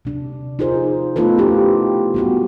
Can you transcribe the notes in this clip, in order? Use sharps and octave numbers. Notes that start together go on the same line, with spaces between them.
C3 D4
D#4 F4 G#4 A#4 C5
A3 B3 D#4 F4 A4 B4
C#4 E4 G4
G3 B3 F#4